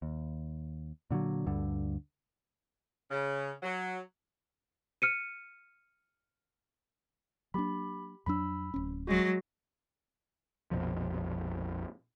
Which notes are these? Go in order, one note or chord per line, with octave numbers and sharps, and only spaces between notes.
D#2
A#2 D3 D#3 F#3
D2 G2 D3
C#3
F#3
F6 C#7 D#7
F#3 A#3 D4 G4 B5
F2 F#3 D4 B5 E6
D1 C#4
F#3 G#3 F#4
A#1 F2 B2 F3